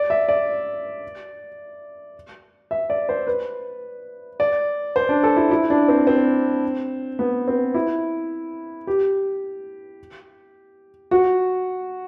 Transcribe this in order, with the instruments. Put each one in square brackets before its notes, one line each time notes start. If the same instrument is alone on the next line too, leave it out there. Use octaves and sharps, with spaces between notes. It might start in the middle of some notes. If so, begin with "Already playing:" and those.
Already playing: [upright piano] D5
E5
D5
E5
D5
C5
B4
D5
C5
D4
A4
E4
E4
D4
C4
C4
B3
C4
E4
G4
F#4